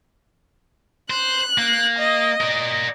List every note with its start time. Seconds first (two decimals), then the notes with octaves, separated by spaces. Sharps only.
1.10 C5 F#6
1.58 A#3
1.98 D#5
2.41 A#4 D5